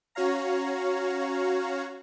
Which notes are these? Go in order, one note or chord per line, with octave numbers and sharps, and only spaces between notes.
C#4 F#4 C#5 F5 A#5